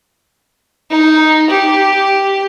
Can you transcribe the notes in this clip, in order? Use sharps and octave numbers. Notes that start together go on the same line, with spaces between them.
D#4
G4